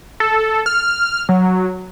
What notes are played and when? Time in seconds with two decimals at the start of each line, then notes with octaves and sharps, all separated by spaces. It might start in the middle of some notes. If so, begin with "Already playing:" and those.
0.20 A4
0.66 F6
1.29 F#3